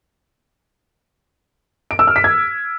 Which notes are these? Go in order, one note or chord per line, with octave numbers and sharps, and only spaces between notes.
D7
E6
F6
B6
G#6